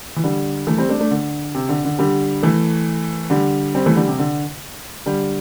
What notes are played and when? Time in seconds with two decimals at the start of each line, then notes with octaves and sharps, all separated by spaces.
0.16 E3
0.24 D3 G3
0.67 E3 A3
0.78 G3 C4
0.89 A3 D4
0.99 A3 D4
1.11 D3
1.54 C3
1.69 D3
1.85 D3
1.99 D3 G3
2.43 E3 A3
3.30 D3 G3
3.75 G3 C4
3.86 E3 A3
3.96 D3 G3
4.08 C3
4.19 D3
5.06 D3 G3